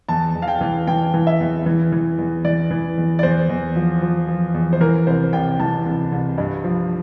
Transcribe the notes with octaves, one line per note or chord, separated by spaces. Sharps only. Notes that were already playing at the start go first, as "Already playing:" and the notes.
E2 A5
E2
F5
G5
E3
E3 G5
E3
E5
E2
E3
E3
E2
E3 D5
E3
E2
D5
E2 C5
E2
F3
F3
F3
E2
C5
E3 A#4
C2 C5
C2 G5
E3 A5
C2
C2
G2
F3